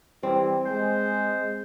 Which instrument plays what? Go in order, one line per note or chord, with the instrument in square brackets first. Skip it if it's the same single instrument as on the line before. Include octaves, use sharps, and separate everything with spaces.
[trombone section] E3 G3 [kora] C4
[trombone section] G#3 [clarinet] C5